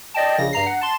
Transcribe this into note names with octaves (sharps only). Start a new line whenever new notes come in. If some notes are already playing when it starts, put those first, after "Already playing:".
D5 D#5 G5 A5
A#1 C#3 A#6
G2 A#5 C7
F#5
A5 C6 E7